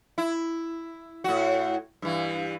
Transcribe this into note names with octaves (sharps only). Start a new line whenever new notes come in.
E4
A2 F#4
G2 E3